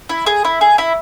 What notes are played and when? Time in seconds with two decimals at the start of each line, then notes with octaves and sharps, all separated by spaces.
0.09 E4
0.26 G#4
0.45 E4
0.61 G#4
0.78 E4